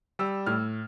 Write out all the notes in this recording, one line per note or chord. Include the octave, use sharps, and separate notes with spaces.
G3 E6
A2 F6